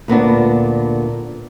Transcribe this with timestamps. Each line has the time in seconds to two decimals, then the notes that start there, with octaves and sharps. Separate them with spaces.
0.08 D2 A#2 B3 D4